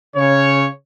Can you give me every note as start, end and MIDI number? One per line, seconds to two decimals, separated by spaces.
0.16 0.67 49
0.16 0.67 73